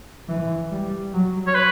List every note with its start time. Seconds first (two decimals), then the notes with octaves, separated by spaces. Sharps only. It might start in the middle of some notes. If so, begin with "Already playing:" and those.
0.28 E3
0.71 G3
1.13 F#3
1.47 C#5
1.55 B4